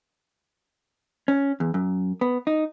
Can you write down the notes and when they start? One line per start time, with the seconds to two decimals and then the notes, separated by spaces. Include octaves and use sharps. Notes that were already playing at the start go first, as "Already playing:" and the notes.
1.28 C#4
1.60 E2
1.74 F#2
2.21 B3
2.47 D#4